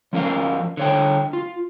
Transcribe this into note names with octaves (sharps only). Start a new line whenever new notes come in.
F3 C#4 A#4 F5
D3 C#5 G5
F4